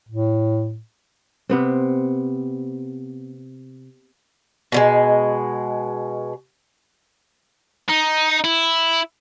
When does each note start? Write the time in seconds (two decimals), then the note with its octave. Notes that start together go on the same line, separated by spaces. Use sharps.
0.09 A2
1.49 C3 B3 C4
4.72 B2 D3 G#3
7.89 D#4
8.44 E4